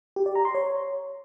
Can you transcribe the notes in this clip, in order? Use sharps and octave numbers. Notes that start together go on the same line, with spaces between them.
G4
D5
A#5
C6
C#5